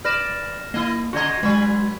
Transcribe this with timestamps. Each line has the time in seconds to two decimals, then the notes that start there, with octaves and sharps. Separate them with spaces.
0.04 B4 D5 F6 A#6 E7
0.74 A#3 E4 D#5
1.13 C#3 F#4 D#5 A#5 C6 G#6
1.43 F#3 G#3 F#4 B4